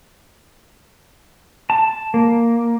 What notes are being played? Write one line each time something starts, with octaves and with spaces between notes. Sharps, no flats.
A5
A#3